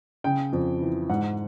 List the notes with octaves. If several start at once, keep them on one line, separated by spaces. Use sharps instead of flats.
C#3 G5
F2
E3
G#2 F#5